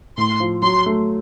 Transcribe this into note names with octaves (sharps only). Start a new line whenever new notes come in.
A2 C6
F3
F#3 C6
A3